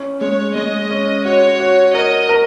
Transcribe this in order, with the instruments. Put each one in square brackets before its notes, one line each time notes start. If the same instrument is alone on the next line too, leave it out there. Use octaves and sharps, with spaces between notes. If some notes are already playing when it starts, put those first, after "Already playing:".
Already playing: [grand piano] C#4
[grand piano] G#3 [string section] C#5
[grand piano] G#3 [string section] D#5
[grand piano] C#4
[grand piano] F#4 [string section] C#5
[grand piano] F#4
[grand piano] A#4 [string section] D#5
[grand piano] A#4